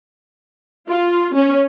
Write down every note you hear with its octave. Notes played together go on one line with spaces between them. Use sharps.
F4
C#4